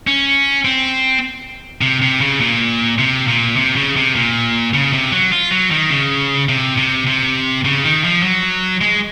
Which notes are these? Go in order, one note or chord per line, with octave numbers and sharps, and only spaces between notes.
C#4
C4
C3
C3
C#3
A#2
C3
A#2
C3
C#3
C3
A#2
C#3
C3
F#3
F4
F#3
D#3
C#3
C3
C3
C3
C#3
D#3
F3
F#3
G#3